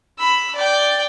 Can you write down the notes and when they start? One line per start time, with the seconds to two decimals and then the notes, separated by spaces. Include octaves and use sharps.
0.19 B5 E6
0.55 D5 G5